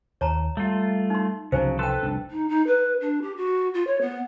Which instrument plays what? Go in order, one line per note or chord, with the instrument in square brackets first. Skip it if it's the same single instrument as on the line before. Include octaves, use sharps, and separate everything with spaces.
[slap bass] D#2 [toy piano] C#5 A5 A#5
[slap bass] G3 [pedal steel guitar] A3 F4
[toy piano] D#4 C6
[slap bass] C2 F3 [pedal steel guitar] C#3 F#3 [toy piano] D#4 C5
[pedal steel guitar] A4 B4 A5 [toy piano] G5 C6
[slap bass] F1 C2 D4
[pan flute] D#4
D#4
B4
D4
G4
F#4
F4
C#5
B3